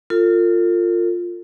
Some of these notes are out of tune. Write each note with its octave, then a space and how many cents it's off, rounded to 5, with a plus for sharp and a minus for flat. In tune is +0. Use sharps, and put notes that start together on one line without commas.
F4 +0 A4 +45